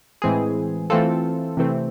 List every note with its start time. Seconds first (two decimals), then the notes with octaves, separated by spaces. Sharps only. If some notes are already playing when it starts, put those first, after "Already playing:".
0.22 A2 E3 G#3 C4 G#4
0.90 E3 A3 C4 F4 A4
1.57 C3 E3 A3 C4